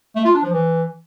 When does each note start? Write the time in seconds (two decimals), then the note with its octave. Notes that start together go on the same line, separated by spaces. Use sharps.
0.16 A3
0.25 F4
0.34 D4
0.44 F3
0.53 E3